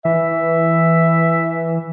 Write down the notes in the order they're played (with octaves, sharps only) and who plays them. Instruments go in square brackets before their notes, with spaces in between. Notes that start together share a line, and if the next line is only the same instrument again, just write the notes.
[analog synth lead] E3 [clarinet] E5